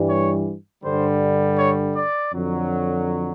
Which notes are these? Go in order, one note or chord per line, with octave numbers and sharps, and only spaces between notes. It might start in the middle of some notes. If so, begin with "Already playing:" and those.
Already playing: G2 E3 G3
C#5
G2 D3 G3 C5
C#5
D5
F2 D3 F#3